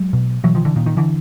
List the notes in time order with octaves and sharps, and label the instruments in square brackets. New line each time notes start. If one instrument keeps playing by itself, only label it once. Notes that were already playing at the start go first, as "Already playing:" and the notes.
Already playing: [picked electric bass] F#3 G#3
B2
B2 E3 F#3
D#3 F3
D3 E3
A#2 D#3
D#3
D3 E3